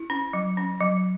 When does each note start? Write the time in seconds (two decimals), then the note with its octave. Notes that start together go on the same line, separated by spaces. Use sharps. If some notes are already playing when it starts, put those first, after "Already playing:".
Already playing: E4
0.10 C#4
0.33 F#3
0.57 C#4
0.80 F#3